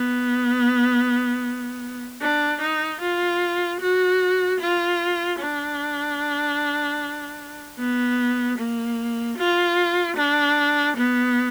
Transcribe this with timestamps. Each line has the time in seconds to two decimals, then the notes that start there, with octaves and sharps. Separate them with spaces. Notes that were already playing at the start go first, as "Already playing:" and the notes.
Already playing: B3
2.21 D4
2.61 D#4
3.01 F4
3.80 F#4
4.60 F4
5.40 D4
7.79 B3
8.59 A#3
9.38 F4
10.17 D4
10.97 B3